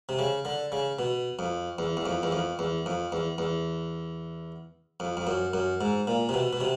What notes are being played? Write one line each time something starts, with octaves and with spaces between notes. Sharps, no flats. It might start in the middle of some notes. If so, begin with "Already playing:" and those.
C3
C#3
D3
C#3
B2
F2
E2
E2
F2
E2
F2
E2
F2
E2
E2
F2
F2
F#2
F#2
G#2
A#2
C3
B2
B2
C3